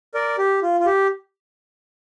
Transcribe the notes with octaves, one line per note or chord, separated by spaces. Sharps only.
A#4 D5
G4
F4
F4
G4